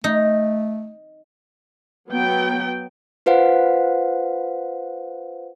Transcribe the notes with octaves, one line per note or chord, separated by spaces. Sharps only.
A3 D#4
F#3 B3 G5
F4 B4 C5 F5 F#5